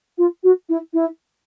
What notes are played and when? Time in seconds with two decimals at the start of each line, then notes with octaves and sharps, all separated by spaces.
0.18 F4
0.43 F#4
0.69 E4
0.94 E4